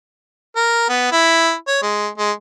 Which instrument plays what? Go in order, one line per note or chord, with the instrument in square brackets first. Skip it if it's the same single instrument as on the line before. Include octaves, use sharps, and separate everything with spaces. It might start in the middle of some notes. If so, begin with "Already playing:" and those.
[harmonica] A#4
B3
E4
C#5
G#3
G#3